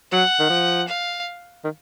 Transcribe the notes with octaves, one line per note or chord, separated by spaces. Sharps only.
F#3 F#5
D#3
F3
F5
D#3